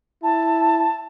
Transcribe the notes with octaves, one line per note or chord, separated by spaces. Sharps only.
E4 A5